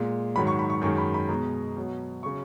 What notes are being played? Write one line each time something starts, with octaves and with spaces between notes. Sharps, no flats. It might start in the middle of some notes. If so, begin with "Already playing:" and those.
Already playing: A#2 G#3
G#2 D#3 F#3 B5
C#6
B5
C#6
F#2 D#3 G#3 C#6
B5
B5
B2 G#3 A#5
B2 F#3
C#3 F#3 C#6